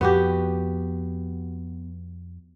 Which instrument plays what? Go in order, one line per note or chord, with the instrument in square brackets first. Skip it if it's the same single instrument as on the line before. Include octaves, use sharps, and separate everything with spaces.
[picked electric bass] F2 [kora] B3 F#4 G4